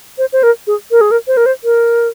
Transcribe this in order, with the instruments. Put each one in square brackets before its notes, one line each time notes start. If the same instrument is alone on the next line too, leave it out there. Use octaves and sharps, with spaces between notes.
[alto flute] C5
C5
A#4
G#4
A#4
G#4
A#4
C5
A#4
C5
A#4